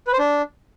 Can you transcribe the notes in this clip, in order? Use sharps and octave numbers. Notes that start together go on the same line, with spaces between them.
B4
C5
D4